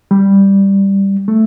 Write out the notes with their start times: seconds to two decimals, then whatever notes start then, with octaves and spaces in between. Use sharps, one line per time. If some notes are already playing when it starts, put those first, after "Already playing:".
0.11 G3
1.28 A3